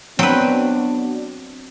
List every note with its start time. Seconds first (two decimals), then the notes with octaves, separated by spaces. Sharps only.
0.19 F#3 B3 C4 D4 F#4 B4